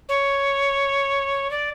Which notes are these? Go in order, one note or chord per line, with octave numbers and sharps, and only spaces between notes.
C#5
D5